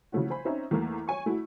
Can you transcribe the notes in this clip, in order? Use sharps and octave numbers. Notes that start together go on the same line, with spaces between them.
C#3 E3 F3 A3 C#4 F#4
C5 G#5 B5
C4 C#4 D#4 E5
E2 A3 A#3
C#5 G#5 C#6
A3 E4 F#4